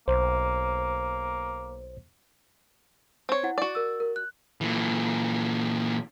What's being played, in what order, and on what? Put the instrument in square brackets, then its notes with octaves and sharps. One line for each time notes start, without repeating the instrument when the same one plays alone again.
[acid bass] B1 [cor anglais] A#3 [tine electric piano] C5
[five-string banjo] C4 C#5
[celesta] E4 F#5
[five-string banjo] F#4 D5
[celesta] A#4 E6
A#4
F#6
[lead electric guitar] A#2 E3